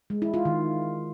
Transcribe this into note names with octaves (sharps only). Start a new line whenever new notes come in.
G#3
E4
F4
D#3